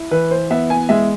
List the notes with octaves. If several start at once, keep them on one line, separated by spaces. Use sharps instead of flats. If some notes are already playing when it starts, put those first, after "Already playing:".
Already playing: E4
E3 B4
C5
B3 E5
G#5
G#3 E5